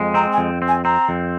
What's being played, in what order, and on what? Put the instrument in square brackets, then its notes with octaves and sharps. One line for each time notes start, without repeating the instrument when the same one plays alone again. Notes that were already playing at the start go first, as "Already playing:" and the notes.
Already playing: [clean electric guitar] F2 G#3
[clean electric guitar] C4 [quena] A#5
[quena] G#5
[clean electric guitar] F2
C4
[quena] G#5
[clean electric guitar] C4 [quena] A#5
[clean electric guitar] F2